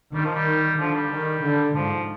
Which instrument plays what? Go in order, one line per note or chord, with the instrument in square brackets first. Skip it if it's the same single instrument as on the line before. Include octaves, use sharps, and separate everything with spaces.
[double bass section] D#3 [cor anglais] G3
[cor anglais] F3
G3
[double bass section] D3 [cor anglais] F3
[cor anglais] G3
[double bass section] D#3
D3
[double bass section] G#2 [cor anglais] F3